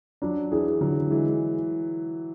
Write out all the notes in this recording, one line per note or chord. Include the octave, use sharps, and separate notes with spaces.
F#3 D4
E3 G#4
D3 F#3
E3 G#3